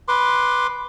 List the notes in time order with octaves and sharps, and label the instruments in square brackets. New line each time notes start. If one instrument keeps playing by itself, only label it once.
[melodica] B4 C6 D6